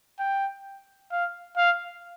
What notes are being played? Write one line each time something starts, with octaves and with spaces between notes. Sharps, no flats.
G5
F5
F5